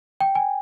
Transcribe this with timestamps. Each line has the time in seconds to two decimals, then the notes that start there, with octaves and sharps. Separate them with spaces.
0.21 G5
0.35 G#5